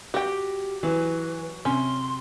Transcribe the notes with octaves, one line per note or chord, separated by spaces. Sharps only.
F#4 G4 G5
E3 F#3 B4
C3 C#4 C6